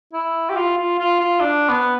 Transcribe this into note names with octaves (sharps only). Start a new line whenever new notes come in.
E4
G4
F4
F4
F4
F4
D4
B3